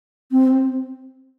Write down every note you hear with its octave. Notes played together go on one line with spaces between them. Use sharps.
C4